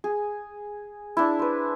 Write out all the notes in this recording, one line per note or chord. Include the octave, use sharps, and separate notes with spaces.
G#4
D4 E4
B4 C5